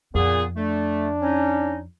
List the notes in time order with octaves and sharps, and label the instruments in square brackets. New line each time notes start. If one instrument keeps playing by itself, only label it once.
[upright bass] F2 [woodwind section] A#2 B3 G#4
[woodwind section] A3 [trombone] D4
[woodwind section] C#4 D#4